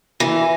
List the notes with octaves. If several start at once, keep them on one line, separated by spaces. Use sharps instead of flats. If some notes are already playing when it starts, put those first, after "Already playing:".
E3